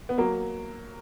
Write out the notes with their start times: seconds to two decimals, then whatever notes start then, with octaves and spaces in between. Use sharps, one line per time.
0.09 B3
0.18 F#3 A#3